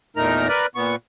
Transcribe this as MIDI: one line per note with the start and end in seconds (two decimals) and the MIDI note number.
0.17 0.48 40
0.17 0.48 46
0.17 0.48 57
0.17 0.48 63
0.17 0.48 70
0.17 0.48 82
0.48 0.66 70
0.48 0.66 71
0.48 0.66 74
0.75 0.96 46
0.75 0.96 59
0.75 0.96 85